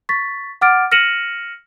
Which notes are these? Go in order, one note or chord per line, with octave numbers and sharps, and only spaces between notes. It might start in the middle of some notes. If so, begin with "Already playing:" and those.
C#6 A6 B6
F#5 D6 F6 A6 D7
F6 A#6 C#7 D#7 E7 F#7